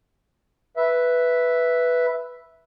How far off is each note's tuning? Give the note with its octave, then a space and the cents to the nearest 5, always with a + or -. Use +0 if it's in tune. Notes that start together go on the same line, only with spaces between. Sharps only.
B4 +0 E5 +0